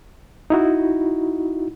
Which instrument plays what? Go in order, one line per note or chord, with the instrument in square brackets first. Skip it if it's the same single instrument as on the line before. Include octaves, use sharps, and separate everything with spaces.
[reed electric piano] D#4 E4 F#4